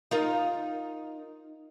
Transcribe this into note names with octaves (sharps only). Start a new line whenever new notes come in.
D#4 F4 A#4